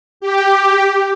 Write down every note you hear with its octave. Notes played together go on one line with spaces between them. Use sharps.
G4